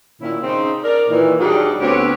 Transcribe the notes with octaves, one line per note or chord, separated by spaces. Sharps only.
A#2 D#3 C#4 E4
C#3 C4 D#4
A#4 D5
A#2 D#3 E3
F#3 G3 D4 D#4 F#4 G#4
D2 B3 C4 G4 C#5